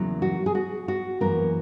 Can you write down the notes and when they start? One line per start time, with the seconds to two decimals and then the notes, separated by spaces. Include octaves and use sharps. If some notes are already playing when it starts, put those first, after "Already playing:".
Already playing: E2 C#3 F#3 A#3 E4
0.22 F#4
0.46 G#4
0.55 F#4
0.88 F#4
1.20 F#2 E3 A#3 A#4